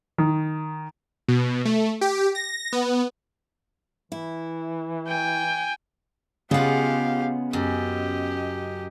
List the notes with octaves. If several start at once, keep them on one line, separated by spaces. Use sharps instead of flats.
D#3
B2
A3
G4
A#6
B3
E3 E4
G5 G#5
C#3 G#3 B3 F4 G4 F5 F#5
F#2 G4 D#5